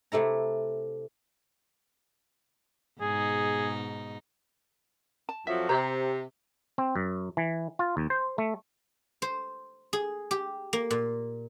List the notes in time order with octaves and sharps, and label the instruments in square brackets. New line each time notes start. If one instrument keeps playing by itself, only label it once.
[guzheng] C3 A3 E4 A#5
[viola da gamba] G#2 B2 D#4 [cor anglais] G#4
[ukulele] A5
[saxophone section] F2 F3 F#3 [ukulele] E5
[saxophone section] C3 [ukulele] C5 A#5
[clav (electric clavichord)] C4
F#2
E3
F4
D#2
C5
A3
[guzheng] C5
G#4
G4
A#3
A#2